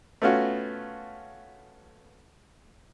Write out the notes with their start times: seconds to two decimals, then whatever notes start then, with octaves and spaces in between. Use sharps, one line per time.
0.22 A3 B3 C#4 F4 F#4